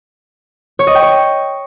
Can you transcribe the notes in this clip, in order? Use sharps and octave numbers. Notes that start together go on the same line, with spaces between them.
C#5
D#5
G5
C#5